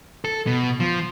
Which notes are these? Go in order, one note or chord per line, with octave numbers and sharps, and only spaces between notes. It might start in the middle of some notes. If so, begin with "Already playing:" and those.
A4
B2
F3